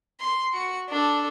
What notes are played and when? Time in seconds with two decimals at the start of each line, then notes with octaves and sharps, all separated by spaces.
0.20 C6
0.53 F#4 C#7
0.89 D4 A4